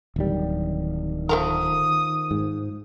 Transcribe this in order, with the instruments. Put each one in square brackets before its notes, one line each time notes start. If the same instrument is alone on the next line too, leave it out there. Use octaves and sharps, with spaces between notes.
[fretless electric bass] D1 G3 [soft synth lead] D#3
[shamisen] F3 A3 A#4 [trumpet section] D#6
[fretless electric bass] G#2